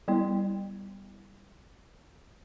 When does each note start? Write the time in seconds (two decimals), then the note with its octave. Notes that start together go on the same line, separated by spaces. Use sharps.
0.08 G3 B3 E4